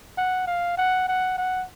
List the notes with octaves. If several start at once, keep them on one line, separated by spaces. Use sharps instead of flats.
F#5
F5
F#5
F#5
F#5